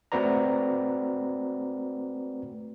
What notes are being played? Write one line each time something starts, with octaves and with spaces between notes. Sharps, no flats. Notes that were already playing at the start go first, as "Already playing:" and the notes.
A3 C4 F#4 B4 D5 A#5